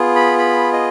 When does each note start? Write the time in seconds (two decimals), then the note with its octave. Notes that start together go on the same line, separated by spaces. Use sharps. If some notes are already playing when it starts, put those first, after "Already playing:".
Already playing: B3 F4 G#4
0.16 B5
0.38 B5
0.73 D#5